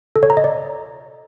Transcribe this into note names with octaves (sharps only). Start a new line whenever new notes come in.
A4
C#5
A#5
D#5
D5